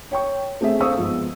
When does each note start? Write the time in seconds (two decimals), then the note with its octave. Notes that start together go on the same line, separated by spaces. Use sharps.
0.11 C#5 G5 C#6
0.61 A3 C4 G#4 E5
0.81 A4 C5 F5 C#6 D#6 E6
0.98 G#2 F3 B3